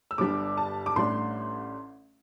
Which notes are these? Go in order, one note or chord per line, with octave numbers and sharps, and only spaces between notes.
E6
G1 G2 G3 D4 D6
A5
D6
A1 A2 G3 D4 C6